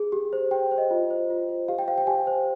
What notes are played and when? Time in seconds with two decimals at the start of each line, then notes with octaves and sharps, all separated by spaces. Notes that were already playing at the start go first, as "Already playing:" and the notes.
Already playing: G#4
0.12 G4
0.33 C5
0.51 G4 G5
0.71 C5
0.78 D#5
0.91 F4
1.11 C5
1.30 F4
1.49 C5
1.68 G4 F5
1.79 G5
1.88 C5 F5
1.98 G5
2.07 G4 G#5
2.27 C5